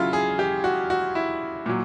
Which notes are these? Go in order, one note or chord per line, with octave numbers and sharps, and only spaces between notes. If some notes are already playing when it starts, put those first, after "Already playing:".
Already playing: C#3 F#3 E4 F4
G#4
G4
F#4
F#4
E4
A#2 F#3